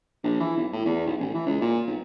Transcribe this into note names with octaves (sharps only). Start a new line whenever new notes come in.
A#1
E3
B1
A2
E2
B1
A1
E3
C#2
A#2
B1